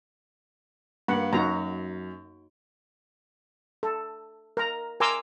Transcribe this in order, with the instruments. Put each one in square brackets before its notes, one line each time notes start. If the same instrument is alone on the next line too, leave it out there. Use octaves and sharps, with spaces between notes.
[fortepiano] G2 [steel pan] A#3 F#5
[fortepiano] F#2 [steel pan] D#4 F#4 A#5
[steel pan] A4
A#4 A#5
A#4 G#5 A#5 C6 D6 E6